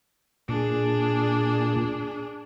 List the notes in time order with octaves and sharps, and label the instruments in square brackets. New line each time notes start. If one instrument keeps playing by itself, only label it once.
[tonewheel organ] A#2 [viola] D4 G#4